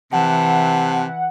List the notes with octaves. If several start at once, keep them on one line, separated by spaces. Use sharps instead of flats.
C3 E3 F#5 A5